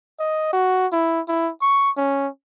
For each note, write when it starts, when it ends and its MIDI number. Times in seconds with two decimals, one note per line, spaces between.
0.20 0.53 75
0.53 0.87 66
0.92 1.21 64
1.28 1.51 64
1.62 1.91 85
1.97 2.28 61